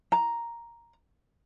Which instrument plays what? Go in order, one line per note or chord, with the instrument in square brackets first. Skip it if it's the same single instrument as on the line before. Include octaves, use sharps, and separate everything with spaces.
[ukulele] A#5